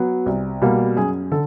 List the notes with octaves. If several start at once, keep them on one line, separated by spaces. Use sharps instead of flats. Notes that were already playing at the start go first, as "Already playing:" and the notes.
Already playing: F#3 B3
C2
B2 G3 A#3
F#2 G#4
D3 A4